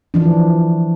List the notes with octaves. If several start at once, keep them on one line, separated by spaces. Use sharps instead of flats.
E3 F3 D4